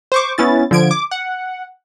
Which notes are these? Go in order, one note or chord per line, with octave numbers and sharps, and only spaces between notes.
C5 C#6 D6
B3 C#4 E4 A6
D3 F3 G#6 D7
D6
F#5